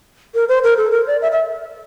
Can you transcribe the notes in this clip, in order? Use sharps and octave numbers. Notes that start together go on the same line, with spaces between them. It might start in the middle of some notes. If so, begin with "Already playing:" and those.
A#4
C5
A#4
A4
A#4
D5
E5
E5